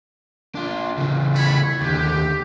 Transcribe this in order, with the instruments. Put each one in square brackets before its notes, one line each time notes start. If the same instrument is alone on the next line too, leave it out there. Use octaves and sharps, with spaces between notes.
[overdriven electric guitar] D4 F4
C#3 E3
[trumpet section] A3 C#5 B5
[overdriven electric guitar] D#2 D3 [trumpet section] G4